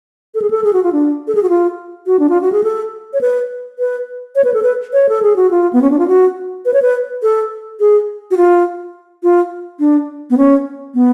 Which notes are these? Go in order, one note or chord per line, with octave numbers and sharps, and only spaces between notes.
A4
G#4
A4
G#4
F#4
F4
D4
A4
G#4
F#4
F4
F#4
D4
F4
F#4
G#4
A4
C#5
B4
B4
C#5
B4
A4
B4
C#5
A4
G#4
F#4
F4
B3
C#4
D4
F4
F#4
B4
C#5
B4
A4
G#4
F#4
F4
F4
D4
B3
C#4
B3